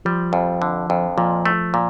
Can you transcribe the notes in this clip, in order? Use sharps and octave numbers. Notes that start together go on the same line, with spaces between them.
F3 G3
F2
D3
F2
A#2 F3
A3
A#2